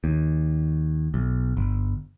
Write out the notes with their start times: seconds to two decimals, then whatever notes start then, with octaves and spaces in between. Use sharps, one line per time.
0.04 D#2
1.14 B1
1.57 G1